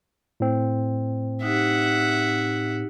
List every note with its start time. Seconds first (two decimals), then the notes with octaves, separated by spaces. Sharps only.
0.40 A2 C4
1.43 D#4 G4 E5 F#5